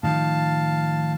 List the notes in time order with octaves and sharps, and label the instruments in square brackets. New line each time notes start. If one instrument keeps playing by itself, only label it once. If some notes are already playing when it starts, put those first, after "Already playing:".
[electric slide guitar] A2 D#3 F3 [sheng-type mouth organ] F5 A5